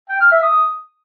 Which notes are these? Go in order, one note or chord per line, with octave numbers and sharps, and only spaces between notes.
G5
F6
E5
D#6